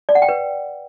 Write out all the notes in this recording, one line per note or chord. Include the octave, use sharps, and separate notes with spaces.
D5
F#5
G5
B4